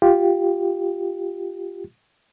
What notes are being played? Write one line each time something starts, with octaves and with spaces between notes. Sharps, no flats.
F4 G4